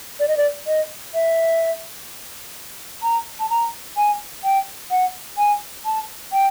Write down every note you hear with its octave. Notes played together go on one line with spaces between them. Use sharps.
D5
D#5
D5
D#5
E5
A#5
A5
A#5
G#5
G5
F#5
G#5
A5
G5